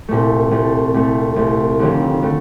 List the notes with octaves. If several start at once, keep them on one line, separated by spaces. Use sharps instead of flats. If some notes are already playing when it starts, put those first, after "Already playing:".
C2 A#2 A3
C2 A#2 A3
C2 A#2 A3
C2 A#2 A3
F1 D#2 D3 A3
D3 A3